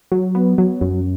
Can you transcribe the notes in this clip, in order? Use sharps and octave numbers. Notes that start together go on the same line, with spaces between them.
F#3
B3
F#3
F#2